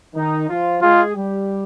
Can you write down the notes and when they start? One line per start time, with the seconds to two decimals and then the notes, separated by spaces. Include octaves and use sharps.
0.15 D#3 D#4
0.49 F3 F4
0.82 G#3 F4 G#4
1.16 G3 G4